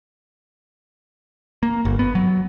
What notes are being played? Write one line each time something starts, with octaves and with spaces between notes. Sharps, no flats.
A#3
G1
B3
F#3